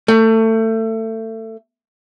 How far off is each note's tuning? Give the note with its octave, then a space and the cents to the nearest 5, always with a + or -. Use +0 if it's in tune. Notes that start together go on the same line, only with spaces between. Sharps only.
A3 +25